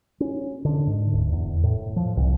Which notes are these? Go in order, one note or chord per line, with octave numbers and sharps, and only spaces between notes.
C#4
D3
G#2
D1
E2
A2
F3
C2